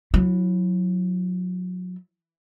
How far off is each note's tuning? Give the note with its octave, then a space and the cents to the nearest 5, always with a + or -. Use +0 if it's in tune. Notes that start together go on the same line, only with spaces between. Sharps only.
F#3 -30 E4 +0